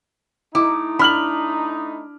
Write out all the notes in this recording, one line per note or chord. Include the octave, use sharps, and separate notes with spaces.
A3 D#4 E4 D6
D4 B5 F6 F#7